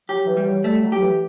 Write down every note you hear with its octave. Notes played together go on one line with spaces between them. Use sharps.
F#3 G4
E3
G3
F#3
G3 A3
F#3
G4
E3